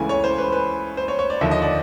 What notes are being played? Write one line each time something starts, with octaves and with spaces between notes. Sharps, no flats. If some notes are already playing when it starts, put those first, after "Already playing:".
Already playing: C#2 C#3 E3 A3 G#5
C#5
C5
B4
B4
C5
C#5
C#5
D5
D#2 D3 F3 A#3 E5
D#5
D5